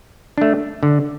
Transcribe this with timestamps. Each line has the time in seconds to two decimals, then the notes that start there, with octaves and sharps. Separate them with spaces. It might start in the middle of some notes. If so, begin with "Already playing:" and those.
0.38 A3 D4
0.83 D3